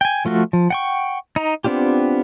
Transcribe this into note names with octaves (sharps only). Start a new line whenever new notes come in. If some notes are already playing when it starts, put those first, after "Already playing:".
G5 G#5
F3 A3 F4 F#4
F3
F#5 G5 C#6
D#4 A#5
B3 C4 D4 F4 G4